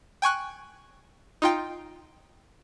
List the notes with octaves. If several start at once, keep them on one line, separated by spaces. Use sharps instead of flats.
G5 G#5 C#6 F#6
D#4 F4 G5